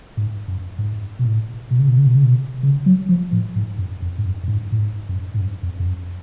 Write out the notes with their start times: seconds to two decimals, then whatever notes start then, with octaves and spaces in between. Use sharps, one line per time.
0.17 G#2
0.48 F#2
0.78 G#2
1.19 B2
1.25 A2
1.71 B2
1.79 C#3
1.88 B2
1.97 C#3
2.06 B2
2.15 C#3
2.24 B2
2.63 C#3
2.86 F#3
3.09 F3
3.32 A2
3.56 G#2
3.78 F#2
4.02 F2
4.18 G#2
4.25 F#2
4.43 F#2
4.48 G#2
4.72 A2
4.79 G#2
5.09 F#2
5.34 G#2
5.40 F#2
5.63 F2
5.80 F2
5.86 F#2